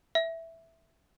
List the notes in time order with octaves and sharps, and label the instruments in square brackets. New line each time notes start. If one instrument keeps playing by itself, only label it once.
[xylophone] E5